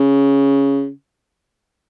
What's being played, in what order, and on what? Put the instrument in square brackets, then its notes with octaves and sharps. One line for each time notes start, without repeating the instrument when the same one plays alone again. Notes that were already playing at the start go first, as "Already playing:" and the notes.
Already playing: [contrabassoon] C#3